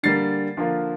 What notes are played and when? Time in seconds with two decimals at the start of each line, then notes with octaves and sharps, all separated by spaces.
0.03 D3 G3 A#3 A6 C7
0.57 D3 F3 A#3 F4